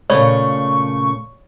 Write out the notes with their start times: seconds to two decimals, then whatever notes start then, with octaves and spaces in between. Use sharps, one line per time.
0.10 A#2 C#3 A3 C#5 D5 B5 C#6